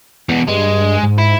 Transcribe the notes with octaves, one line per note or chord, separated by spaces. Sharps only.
E2 B2
G2 G#3
G#2
E4